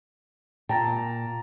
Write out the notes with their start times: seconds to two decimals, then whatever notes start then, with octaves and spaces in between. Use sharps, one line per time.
0.69 A#2 G5 A5 A#5 A6